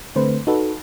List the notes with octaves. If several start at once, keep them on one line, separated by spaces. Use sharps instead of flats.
D3 A3 C4 B4 C5
D#4 F#4 A4 B4